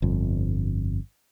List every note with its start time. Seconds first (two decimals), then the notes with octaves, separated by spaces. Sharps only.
0.02 G1 F2